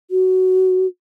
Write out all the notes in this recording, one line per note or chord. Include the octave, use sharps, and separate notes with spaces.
F#4